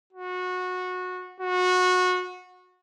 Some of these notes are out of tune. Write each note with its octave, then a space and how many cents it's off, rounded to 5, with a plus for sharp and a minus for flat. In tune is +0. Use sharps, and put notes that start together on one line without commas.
F#4 -20
F#4 -25